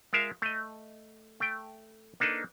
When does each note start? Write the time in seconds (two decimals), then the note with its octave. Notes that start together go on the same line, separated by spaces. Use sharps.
0.13 G#3 F4 A#4 E5 F5
0.42 A3 D#5
1.40 A3 G5
2.20 A#3 D4 D#4 A4 B4